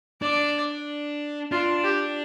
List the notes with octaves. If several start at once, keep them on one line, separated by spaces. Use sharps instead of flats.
D4 D5
D4 F4
G4